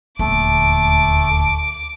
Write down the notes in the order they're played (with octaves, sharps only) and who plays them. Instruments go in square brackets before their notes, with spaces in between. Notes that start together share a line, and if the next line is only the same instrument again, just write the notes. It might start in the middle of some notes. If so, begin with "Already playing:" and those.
[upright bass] D#1 D2 [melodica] A3 [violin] D6